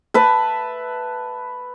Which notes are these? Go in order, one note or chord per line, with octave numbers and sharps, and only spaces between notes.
B4 E5 A5